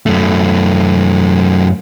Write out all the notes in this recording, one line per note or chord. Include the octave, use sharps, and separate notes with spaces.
F#2 A3